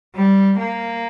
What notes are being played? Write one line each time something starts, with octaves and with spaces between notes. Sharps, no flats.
G3
A#3